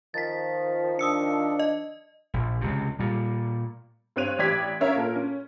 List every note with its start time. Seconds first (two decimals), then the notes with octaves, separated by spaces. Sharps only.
0.14 D#3 F3 A6 B6
0.99 D4 D#6 E6 C#7
1.59 D#5
2.34 A#1
2.61 C#2 C3
2.99 A#2 G3
4.16 G2 C4 C#5 F#6 D#7 F7
4.39 A1 G4 D5 G#6 B6
4.80 C#4 A#4 C#5 E5 F5 A#5
4.96 A#2 A4 A#4
5.15 C#4